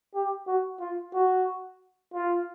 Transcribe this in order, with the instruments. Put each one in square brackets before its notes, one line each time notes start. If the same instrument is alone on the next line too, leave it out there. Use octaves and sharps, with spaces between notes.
[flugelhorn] G4
F#4
F4
F#4
F4